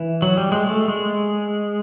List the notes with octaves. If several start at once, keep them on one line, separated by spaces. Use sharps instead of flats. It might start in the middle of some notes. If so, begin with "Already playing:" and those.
Already playing: E3
F#3
G3
G#3
A3
G#3